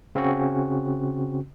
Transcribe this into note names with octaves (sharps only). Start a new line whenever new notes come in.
C#3 C4 C#4 F#4